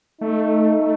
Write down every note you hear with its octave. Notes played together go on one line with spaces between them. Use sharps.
A3 D#4
A3